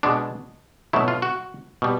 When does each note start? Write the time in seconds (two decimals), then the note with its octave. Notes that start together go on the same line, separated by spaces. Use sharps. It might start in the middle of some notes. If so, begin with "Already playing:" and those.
0.03 B2 G#3 B3 D4
0.93 B2 F#3 A3 E4
1.08 F4
1.22 F#4
1.82 B2 G3